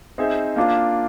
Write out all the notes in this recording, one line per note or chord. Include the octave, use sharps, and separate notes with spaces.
C4 D#4 G#4 C5 E5
A#3 D4 F4